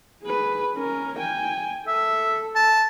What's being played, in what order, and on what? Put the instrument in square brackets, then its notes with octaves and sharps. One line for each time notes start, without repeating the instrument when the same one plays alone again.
[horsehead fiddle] G#4 B4
C#4 A#4
G5 G#5
[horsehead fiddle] A4 [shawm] E5
[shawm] A5